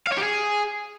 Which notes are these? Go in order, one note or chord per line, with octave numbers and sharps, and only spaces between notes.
F5
C#5
G4
G#4